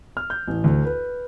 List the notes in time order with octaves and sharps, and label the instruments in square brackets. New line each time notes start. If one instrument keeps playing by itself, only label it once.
[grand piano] F6
G6
A1
D2
B4